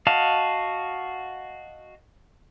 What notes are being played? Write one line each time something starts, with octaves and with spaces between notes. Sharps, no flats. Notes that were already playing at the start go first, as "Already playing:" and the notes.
F#4 D#5 F5 A5